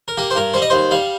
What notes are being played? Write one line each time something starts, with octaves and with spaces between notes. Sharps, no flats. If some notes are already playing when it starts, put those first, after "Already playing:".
A#4
A#3 G4
C5
G2 A#4
G3 C5
D#5
D#2 C5
G3 F5